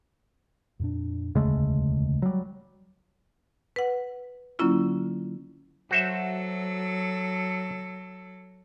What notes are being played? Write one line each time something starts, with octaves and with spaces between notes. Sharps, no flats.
F2 A#2 D4
E1 D2 C#3 G#3 A3
F#3 G3
B4 F#5
D3 F#3 A#3 C#4 E4 F4
F#3 F#4 A4 C5 E5